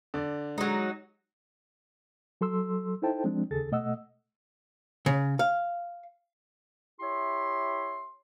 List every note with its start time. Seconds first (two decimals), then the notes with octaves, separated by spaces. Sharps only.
0.14 D3 D5
0.58 F#3 G#3 D#4
2.41 F#3 A4 C6 E6
3.02 D#4 E4 A4 C5 G5 A5
3.24 F3 G#3 C4 D4
3.51 D#2 C#3 G#4 A4 A6
3.72 B2 A3 D#5 F#5 E6
5.06 C#3
5.39 F5
7.00 E4 G4 C#5 E5 C6